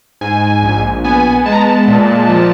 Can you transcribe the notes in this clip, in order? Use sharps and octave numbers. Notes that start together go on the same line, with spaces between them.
G#2 G#5
A#1
B3 G#5
G#3 A5
A#5
A5
A#2
F3